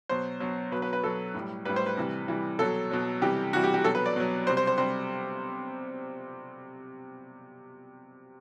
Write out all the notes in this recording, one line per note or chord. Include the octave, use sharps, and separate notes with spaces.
B2 F#3 C5
B2 F#3
B2 F#3 B4
B4
B4
B2 F#3 A4
A2 G3
A2 G3 B4
C5
B4
C3 E3 G3
C3 E3 G3
B2 F#3 A4
B2 F#3
C3 E3 G3 G4
C3 E3 G3 F#4
G4
G4
B2 F#3 A4
B4
D5
B2 F#3
C3 G3 C5
C5
C5
C3 G3 C5